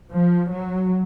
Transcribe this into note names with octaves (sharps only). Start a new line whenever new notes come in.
F3
F#3